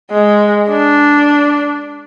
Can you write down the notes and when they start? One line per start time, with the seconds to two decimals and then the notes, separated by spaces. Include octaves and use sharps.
0.11 G#3
0.70 D4